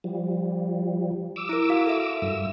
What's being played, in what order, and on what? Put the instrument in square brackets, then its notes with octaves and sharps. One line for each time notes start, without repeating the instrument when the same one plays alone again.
[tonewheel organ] F3 G3
D6 E6
[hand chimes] E4 A#4
F#4 F5
A4 E5
[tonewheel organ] G2 E6